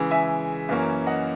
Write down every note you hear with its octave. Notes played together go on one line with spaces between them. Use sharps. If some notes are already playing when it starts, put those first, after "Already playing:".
Already playing: C#3 E3 G#3
E5 G#5
F#2 E3 A#3 C#4
D#5 F#5